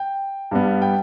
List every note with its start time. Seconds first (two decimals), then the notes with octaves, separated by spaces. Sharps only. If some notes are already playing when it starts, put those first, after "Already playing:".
Already playing: G5
0.51 G2 G3 B3
0.82 G5